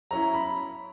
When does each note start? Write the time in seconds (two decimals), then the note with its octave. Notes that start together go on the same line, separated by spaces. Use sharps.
0.11 F#3 C#4 E4 A#5
0.34 B5